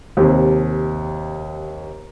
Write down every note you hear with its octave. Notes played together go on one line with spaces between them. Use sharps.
D#2 C3